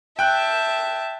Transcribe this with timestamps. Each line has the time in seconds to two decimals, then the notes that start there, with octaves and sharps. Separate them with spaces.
0.19 E5 G5 A5 F#6